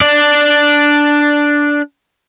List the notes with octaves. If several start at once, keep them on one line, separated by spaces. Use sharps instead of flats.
D4 D5